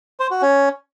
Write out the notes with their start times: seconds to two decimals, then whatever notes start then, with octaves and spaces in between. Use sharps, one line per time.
0.20 C5
0.31 F#4
0.42 C#4